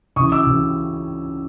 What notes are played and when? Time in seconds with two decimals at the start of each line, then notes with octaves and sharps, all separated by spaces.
0.16 C#2 C#3 E3 C#6 D#6
0.32 D6 E6
0.46 C#2 C#3 E3